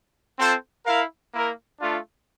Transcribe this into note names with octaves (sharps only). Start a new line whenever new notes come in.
C4 F4 A4 C5
E4 A#4 F5
A#3 E4 A#4
A3 D4 F4